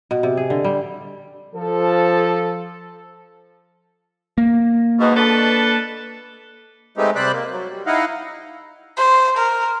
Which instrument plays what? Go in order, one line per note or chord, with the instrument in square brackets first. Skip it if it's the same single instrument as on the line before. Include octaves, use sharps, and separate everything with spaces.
[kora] B2
C3
G#4
D3
G3
[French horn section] F3 A4
[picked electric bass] A#3
[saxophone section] G#2 B2
D4 A4 B4
[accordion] G#3 A3 B3 C4 D#4 G4
C3 G3 C5 D5 B5 F#6
A#3
F#3
G3
D#4 E4 D#5 F5 F#5
[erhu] C5
A#4